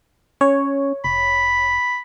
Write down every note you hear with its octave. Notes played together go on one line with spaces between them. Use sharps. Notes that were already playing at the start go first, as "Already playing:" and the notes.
C#4 C#5
F1 B5